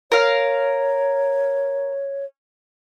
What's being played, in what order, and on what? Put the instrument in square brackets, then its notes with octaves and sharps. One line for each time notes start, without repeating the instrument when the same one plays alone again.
[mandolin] A#4 F5 [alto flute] C#5